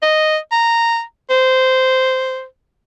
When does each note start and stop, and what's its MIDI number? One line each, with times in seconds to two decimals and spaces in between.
0.02 0.37 75
0.52 1.02 82
1.30 2.44 72